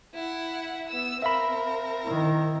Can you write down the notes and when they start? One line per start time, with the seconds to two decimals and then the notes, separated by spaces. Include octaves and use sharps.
0.14 E4 F#5
0.89 B3 E6
1.22 C4 A#4 E5 F5 B5
2.04 D#3 E4